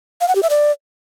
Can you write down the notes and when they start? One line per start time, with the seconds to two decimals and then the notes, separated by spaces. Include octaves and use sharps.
0.21 F5
0.28 F#5
0.35 G4
0.43 E5
0.50 D5